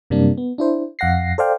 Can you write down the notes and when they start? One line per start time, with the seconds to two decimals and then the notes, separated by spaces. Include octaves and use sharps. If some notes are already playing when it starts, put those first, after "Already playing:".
0.10 F#2 C3 G3 A#3 D4
0.38 B3
0.58 D4 E4 C5
0.99 F2 F5 F#5 A#6 C7
1.38 A4 C5 D5 F5 G5